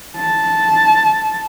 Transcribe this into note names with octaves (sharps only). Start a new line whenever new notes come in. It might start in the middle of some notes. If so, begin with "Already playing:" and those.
A5